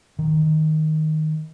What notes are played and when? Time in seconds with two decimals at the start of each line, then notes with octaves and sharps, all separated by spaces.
0.19 D#3